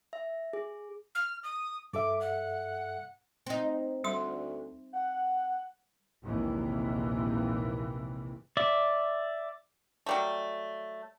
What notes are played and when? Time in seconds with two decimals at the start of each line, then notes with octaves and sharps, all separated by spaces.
0.13 E5
0.53 G#4
1.15 F6
1.43 D#6
1.93 G2 A4 E5 D6
2.21 F#5
3.46 C4 D#4
4.04 D2 G3 C6
4.94 F#5
6.24 A#1 D#2 G#2 C3 E3
8.57 D5 E5
10.06 F#3 G3 A3